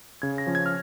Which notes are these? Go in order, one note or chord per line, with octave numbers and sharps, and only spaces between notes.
C#3 G#6
A#6
F3 C#4
G#6
F6